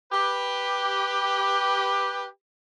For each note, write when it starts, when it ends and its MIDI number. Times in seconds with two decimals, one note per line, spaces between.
0.12 2.27 67
0.12 2.27 71